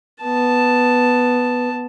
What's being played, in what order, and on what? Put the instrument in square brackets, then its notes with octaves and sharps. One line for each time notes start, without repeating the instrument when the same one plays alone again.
[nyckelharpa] B3 A5